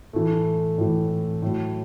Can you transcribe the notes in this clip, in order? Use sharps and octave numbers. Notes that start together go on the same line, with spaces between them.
A2 E3 A3
A2 E3
A2 F#3